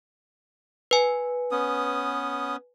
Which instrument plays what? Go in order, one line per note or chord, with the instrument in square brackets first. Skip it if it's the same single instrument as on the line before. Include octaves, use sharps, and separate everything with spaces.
[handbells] B4 G#5
[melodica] B3 C#4 D#6